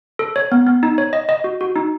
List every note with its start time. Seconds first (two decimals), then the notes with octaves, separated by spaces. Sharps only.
0.19 A4
0.36 C#5
0.52 B3
0.67 B3
0.83 D#4
0.98 C#5
1.13 D#5
1.29 D#5
1.44 F#4
1.61 F#4
1.76 D#4